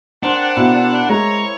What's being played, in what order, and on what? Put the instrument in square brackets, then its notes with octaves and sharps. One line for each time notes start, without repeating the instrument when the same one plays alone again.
[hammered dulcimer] C4 A#4 C5 [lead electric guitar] D4 [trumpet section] F#5
[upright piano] B2 [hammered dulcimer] A#3 E4
[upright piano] G#3 [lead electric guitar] C#5 [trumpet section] A#5